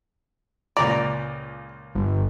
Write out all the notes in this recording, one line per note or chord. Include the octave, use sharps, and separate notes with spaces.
C#2 A#2 D5 A#5
G1